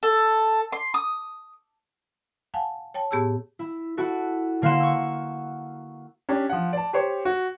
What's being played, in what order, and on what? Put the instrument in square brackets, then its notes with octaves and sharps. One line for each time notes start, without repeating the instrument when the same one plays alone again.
[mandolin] A4
C6
D#6
[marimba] F5 F#5 G#5 A5
C#5 G5 A5
A2 B3 G4 G#4 A5 E6
[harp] E4
E4 F#4 A4
D3 A#3 F5 F#5 C6 E7
C#6 E6
[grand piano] C#4 D4 G4
F3 F#5
D5 A5
G4 C5 C#5
F#4